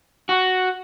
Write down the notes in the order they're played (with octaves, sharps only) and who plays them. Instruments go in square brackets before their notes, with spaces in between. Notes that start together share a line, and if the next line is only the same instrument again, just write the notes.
[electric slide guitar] F#4